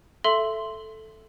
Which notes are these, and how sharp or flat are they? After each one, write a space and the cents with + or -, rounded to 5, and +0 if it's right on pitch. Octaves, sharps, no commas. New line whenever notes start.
A4 +0 E5 +15 C6 +0